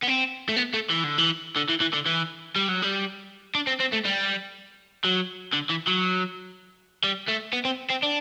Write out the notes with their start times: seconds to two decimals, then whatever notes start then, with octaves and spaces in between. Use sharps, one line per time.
0.03 B3
0.07 C4
0.49 A3
0.56 B3
0.74 A3
0.90 E3
1.04 D3
1.18 E3
1.56 D3
1.69 E3
1.80 E3
1.93 D3
2.06 E3
2.56 G3
2.68 F#3
2.82 G3
3.55 D4
3.67 C4
3.80 C4
3.92 A3
4.05 G3
5.04 F#3
5.53 D3
5.70 E3
5.88 F#3
7.04 G3
7.28 A3
7.53 B3
7.65 C4
7.90 C4
8.03 D4